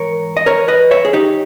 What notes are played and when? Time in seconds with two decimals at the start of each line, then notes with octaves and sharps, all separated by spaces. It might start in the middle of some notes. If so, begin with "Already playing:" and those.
Already playing: G#2 E3 A#4 C#5
0.37 D#5
0.46 A#4 C#5
0.68 B4 D#5
0.91 C#5 E5
1.05 G#4
1.13 D#4 G4